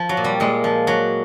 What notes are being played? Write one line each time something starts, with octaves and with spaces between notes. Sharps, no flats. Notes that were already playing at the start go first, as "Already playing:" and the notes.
Already playing: F3
F#3
A#2
G3
A#2 G#3
F3
F#3